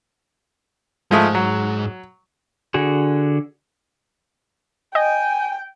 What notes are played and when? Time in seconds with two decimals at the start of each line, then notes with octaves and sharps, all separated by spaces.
1.11 G#2 F3 G#3 A3
1.35 F#3
2.74 D3 F#4 G#4
4.95 D#5 G5 G#5